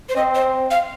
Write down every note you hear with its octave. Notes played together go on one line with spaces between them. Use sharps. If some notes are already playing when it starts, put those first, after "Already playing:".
C5
C4 D#5
C5
F5